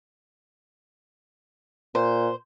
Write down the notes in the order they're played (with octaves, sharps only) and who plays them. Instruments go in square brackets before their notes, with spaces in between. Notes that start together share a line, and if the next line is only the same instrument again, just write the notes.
[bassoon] A#2 [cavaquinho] C5